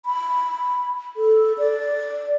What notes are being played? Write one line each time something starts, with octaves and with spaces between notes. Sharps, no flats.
B5
A4
D5